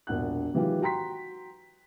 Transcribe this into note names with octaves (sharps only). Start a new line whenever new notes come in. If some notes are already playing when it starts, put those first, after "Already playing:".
E1 A#1 F#5 F#6
D#3 E3 F#3 G#3 F4 G4
F#4 G5 A#5 C6 B6